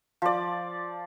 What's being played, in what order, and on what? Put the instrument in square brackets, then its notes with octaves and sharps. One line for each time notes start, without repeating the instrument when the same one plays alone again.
[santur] F3 D5